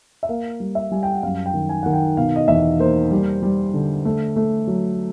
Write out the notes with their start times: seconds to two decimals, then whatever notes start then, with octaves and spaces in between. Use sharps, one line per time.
0.23 E5
0.29 A#3 F5
0.60 G3
0.75 E5
0.91 G3 G#5
1.03 G5
1.13 F#5
1.23 F#2 F5
1.46 G5
1.54 D#3
1.69 G#5
1.83 D#3 F#5
1.93 G5
2.17 B2 F5
2.36 D#5
2.48 E2 E5
2.79 A#3 C5
3.11 G3
3.43 G3
3.74 D3
4.05 A3
4.36 A3
4.68 F#3